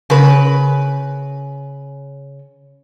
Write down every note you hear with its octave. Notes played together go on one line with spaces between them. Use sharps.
C#3 B4